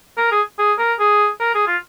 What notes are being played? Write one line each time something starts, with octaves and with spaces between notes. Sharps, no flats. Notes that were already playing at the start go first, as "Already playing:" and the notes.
A#4
G#4
G#4
A#4
G#4
A#4
G#4
F4